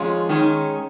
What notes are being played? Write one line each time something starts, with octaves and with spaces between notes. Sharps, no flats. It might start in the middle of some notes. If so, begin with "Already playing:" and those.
Already playing: F2 D#3 G#3 C#4 F4
D#3 G#3 C#4